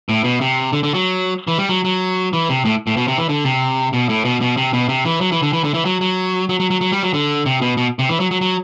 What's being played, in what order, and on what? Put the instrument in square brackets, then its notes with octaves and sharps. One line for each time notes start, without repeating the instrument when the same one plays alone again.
[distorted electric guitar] A2
B2
C3
D3
D3
F#3
E3
G3
F#3
F#3
E3
C3
A2
A2
B2
C3
E3
D3
C3
B2
A2
B2
B2
C3
B2
C3
E3
F#3
E3
D3
E3
D3
E3
F#3
F#3
F#3
F#3
F#3
F#3
G3
F#3
D3
C3
B2
B2
C3
E3
F#3
F#3
F#3